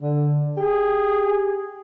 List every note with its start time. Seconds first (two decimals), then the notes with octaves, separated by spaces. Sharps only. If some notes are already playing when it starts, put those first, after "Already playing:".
0.02 D3
0.58 G4 G#4